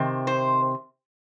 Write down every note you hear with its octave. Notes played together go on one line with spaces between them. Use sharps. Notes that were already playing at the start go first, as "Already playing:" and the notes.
Already playing: C3 D#3 C4
C5